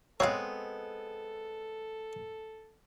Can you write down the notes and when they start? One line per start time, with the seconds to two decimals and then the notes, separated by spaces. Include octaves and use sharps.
0.20 G#3 B3 C4 A4 C#5 F5